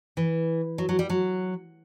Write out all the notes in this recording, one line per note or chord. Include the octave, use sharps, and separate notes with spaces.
E3
F#3
F#3
G3
F#3